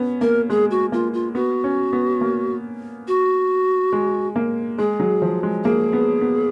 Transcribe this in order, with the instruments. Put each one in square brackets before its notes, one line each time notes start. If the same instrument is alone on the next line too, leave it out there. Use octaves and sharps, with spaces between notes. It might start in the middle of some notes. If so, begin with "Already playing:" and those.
Already playing: [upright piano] B3 C#4
[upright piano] A#3 [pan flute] A#4
[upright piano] G#3 [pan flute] G#4
[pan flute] F#4
[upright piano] A#3 [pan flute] F4
[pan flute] F4
[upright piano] B3 [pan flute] F#4
[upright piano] C#4
B3
A#3
[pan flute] F#4
[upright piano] G#3
A#3
[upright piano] G#3 [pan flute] G#4
[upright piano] F#3
F3
G#3
[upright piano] A#3 [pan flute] G#4
[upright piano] B3
B3